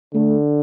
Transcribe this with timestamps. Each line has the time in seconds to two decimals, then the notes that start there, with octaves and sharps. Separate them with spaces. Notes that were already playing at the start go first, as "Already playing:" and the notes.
0.14 D3 A3